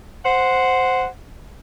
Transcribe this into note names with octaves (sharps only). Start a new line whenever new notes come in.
C5 F#5